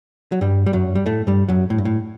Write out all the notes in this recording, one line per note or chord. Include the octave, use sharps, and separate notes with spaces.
F#3
G2 G3
G3
F#2 F#3
G3
A2 A3
G2 G3
F#2 F#3
A2
G2
A2